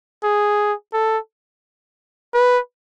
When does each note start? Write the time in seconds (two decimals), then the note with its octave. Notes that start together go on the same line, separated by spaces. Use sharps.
0.24 G#4
0.93 A4
2.34 B4